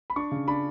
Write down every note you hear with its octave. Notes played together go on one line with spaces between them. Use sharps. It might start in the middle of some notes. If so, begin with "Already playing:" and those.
B5
D4 C#6
C#3
D4 B5